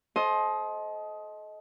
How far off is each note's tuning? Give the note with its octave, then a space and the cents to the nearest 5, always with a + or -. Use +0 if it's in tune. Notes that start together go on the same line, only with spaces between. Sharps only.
A4 -35 C5 +15 D#5 +15